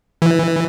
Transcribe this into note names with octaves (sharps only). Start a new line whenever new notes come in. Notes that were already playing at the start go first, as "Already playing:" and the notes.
E3